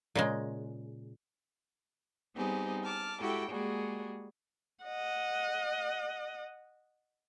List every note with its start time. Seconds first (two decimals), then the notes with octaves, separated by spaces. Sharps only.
0.15 A#2 C#3 G#3
2.35 G3 B3 C4 D#4 G4 G#4
2.84 A5 D6 F6
3.20 G#3 E4 F#4 G4 A4 G5
3.50 G3 G#3 A#3 F#4 G#4
4.84 D#5 F#5